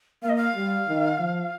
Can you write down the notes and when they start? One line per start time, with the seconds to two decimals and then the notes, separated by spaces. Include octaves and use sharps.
0.23 A#3 F5
0.29 D#5
0.36 F5
0.55 G3
0.88 D#3
1.19 F3